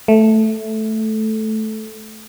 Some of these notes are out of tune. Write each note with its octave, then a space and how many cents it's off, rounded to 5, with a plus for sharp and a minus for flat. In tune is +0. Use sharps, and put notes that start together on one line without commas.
A3 -10